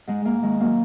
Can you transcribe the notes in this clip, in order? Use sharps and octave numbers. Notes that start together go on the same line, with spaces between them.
G#2 G#3
G#2 A#3
D#3 G#3
F#3 A#3